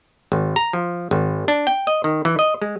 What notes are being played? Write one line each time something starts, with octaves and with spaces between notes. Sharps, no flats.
G#1
A#5
F3
G#1
D4
G5
D#5
D#3
E3
D#5
G#3